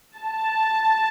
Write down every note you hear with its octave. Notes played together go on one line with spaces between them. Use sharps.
A5